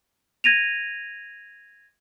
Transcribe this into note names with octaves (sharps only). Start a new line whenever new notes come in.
G#6 A#6 D#7 F7